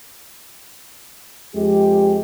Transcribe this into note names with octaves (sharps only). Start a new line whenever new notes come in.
F2 G#3 G4